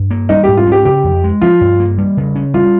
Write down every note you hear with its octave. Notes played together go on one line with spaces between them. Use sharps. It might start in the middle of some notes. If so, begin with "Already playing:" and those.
Already playing: G2
A#3
G3 D#4
G#2 G4
F4
C#4 G4
C#3 G4
F2
G#3
F3 F4
G2
A#3
G3
C#3
C#4
G3 F4